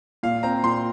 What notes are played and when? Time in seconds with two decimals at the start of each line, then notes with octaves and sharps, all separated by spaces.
0.23 A#2 F5
0.43 C4 A#5
0.63 A#2 C6